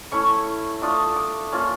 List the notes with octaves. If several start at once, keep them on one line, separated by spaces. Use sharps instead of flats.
A3 C#4 E4 C#6
A3 D4 F4 D#6
D6
A#3 C#4 F4